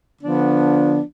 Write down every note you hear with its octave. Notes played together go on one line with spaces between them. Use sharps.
D3 F3 B3 D4